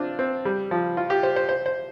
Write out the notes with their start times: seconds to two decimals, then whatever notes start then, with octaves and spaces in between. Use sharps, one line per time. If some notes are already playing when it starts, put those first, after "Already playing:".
Already playing: C4 D4 F4
0.19 C4
0.45 G3
0.71 F3
0.97 F4
1.10 G4
1.23 C5
1.36 C5
1.49 C5
1.66 C5